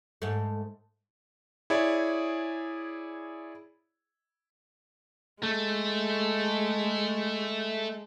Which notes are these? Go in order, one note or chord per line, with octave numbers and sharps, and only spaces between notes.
G#2 A3
E4 G#4 C#5 D5
G#3 A3